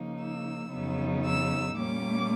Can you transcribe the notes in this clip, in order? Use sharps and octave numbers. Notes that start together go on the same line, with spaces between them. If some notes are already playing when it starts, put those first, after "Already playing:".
Already playing: C#3 F3 A#3 D#4
E6
F2 C#3 F#3 B3 D#4
E6
A#2 G3 A#3 C#4 D6